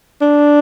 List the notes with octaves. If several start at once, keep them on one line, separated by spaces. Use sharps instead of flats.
D4